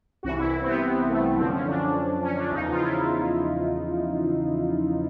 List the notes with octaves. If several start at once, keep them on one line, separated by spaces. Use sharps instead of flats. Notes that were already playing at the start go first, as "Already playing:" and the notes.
C2 C3 E3 F#4
E4
C4
B3
A3
F#2 D3 F3 C4
C#4
D4
C#4
D4
E2 C#3 F3 D#4
F4
E4